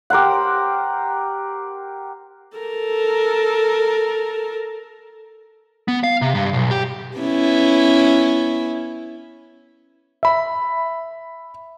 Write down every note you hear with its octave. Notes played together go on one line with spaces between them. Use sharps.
G4 A#4 C5 F#5
A4 A#4
B3
F5
C3
G2
B1
G4
B3 C#4 E4
E5 B5